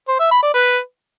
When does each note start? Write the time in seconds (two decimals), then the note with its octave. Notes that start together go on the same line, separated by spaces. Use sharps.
0.08 C5
0.20 E5
0.31 B5
0.43 D5
0.54 B4